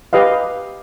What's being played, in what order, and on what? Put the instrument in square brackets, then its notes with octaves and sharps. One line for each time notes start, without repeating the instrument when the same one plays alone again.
[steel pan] G4 B4 D#5 F5